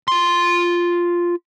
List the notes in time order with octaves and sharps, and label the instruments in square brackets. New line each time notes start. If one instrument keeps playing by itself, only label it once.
[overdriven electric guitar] F4 C6